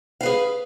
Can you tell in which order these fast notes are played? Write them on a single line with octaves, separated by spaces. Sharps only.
F5 B4 G#4